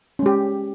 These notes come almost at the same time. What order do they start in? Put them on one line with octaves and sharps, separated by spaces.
C#4 G#3 G4